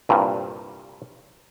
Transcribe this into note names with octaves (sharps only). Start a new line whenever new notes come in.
C2 G2 A#2